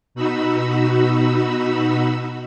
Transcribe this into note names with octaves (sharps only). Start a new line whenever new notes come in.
B2 D#4 F#4 B5 E6